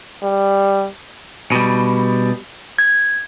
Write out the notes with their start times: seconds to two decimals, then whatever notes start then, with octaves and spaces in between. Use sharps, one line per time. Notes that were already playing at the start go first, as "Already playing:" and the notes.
0.23 G3
1.52 B2 G3
2.78 G#6